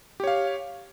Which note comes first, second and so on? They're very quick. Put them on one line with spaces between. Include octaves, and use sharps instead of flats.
G4 C#5 F5